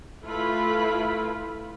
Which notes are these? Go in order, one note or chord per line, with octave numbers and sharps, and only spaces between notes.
A3 E4 F4 A4 B4 B5